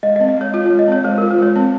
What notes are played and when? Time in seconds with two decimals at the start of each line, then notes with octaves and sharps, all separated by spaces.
0.03 G#3 D#5
0.16 D#5
0.20 C4
0.28 D#5
0.37 G#3 C#5
0.54 F4 C#5
0.66 G#3 C#5
0.79 D#5
0.88 C4 C#5
1.04 G#3 C5
1.18 F4 A#4
1.30 C5
1.38 G#3 C#5
1.56 C4